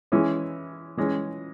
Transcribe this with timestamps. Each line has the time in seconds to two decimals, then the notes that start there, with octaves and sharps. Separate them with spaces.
0.12 E3 G#3 C#4 E4
0.97 E3 G#3 C#4